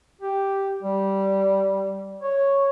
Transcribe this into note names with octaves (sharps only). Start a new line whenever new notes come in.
G4
G3
C#5